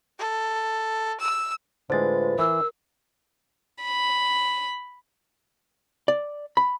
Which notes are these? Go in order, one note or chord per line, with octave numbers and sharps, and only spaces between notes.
A4
E6
A2 D3 G#3 F4 B4 C5 A6
E3 A#4 E6
B5
D5
B5